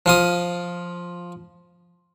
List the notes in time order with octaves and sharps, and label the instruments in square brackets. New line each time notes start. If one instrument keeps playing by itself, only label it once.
[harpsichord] F3 F4 D#6